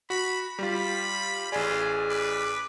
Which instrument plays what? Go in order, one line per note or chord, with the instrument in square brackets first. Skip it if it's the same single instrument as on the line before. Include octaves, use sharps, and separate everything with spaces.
[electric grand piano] F#4 [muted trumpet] B5
[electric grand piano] G3 F4 [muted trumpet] B5
[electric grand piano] A1 D5 [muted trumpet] F4 [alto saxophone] G#4 [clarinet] G#5
[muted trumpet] B4 [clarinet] D6